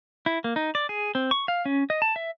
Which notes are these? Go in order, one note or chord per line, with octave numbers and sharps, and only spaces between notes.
E4
A#3
D#4
D5
G#4
C4
C#6
F5
C#4
D#5
A5
E5